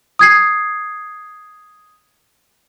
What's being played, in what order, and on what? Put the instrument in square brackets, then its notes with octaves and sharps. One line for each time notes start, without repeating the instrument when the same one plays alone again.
[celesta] D#6 G#6 C7